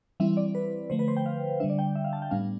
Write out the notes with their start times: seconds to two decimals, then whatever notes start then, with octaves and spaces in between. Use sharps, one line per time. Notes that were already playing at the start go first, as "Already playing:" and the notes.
0.20 E3 G3 C4 E4 E5
0.37 D5
0.55 B4
0.90 D3 F3 A3 C5
0.99 B4
1.08 C5
1.17 G5
1.26 F5
1.60 D3 G3 D4 E5
1.70 D5
1.79 G5
1.95 E5
2.04 F5
2.13 A5
2.22 G5
2.31 A2 G3 B3 D4 F5